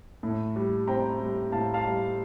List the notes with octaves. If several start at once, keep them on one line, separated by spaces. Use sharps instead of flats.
A2
G3
C4 G5 A#5
G3
A2 F5 A5
F5 A5
G3